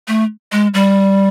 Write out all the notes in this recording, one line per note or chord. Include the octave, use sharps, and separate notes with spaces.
A3
G#3
G3